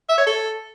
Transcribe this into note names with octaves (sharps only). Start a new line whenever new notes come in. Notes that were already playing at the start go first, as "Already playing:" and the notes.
E5
C#5
A4